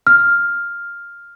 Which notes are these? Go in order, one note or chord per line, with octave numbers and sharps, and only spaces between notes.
F6